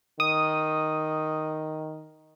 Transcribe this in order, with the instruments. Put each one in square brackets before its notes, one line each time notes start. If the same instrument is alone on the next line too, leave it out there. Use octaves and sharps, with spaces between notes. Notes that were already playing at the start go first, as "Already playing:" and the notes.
[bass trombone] D#3 [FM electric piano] D#6